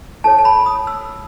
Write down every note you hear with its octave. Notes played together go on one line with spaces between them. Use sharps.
E4 A4 C#5 A5
A5
B5
D#6
E6